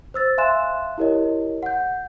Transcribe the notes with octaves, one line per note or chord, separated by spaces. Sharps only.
C5 E6 A6
E5 F5 G#5 C6 F#6 E7
E4 G4 A#4 C#5 D#5
F#5 G6